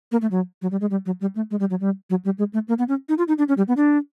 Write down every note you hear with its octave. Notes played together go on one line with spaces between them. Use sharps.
A#3
A3
F#3
F#3
G3
G#3
G3
F#3
G3
A3
G#3
G3
F#3
G3
F#3
G3
G#3
A3
A#3
B3
C#4
D#4
F4
D#4
D4
C#4
G3
B3
D4